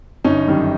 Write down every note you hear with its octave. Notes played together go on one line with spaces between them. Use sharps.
G1 C#4 D#4
F#2 D#3 G3